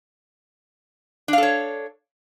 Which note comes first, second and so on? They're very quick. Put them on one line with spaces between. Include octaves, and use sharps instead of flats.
D4 F5 A4 C#5